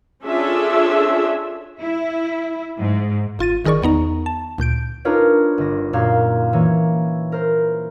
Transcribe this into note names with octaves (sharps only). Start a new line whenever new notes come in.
C#4 D4 F4 G#4 A4 E5
E4
G#2
G1 F4 A6 D#7
G1 D#3 G#4 A#4 D5 C#6
E2 B3 D#4 A#5
A5
D2 A#2 G6 D7
D4 D#4 F4 A#4 B4 C#5
G1 A#6
F#2 A#2 F#4 F5 C6 G#6
E3 A#3 C#5
A#4 C5